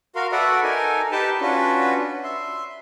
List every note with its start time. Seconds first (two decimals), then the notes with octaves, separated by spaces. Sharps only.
0.15 F#4 A#4 F5 C6
0.32 F#4 A4 B4 D5 E5 F#5
0.63 D#4 A4 A#4 G#5
1.12 D#4 G4 B4 G5 A5
1.41 C#4 D4 F4 F#4 B4
2.24 E5 C6